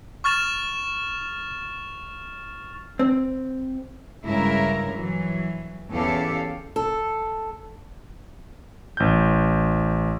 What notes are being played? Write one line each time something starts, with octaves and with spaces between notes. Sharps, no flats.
C#6 F6 A6 E7 F7
C4
G2 C#3 G#3 E4 A#4 E5
E3 F#3
E2 C#4 E4 G4 A4 F5
A4
A1 G6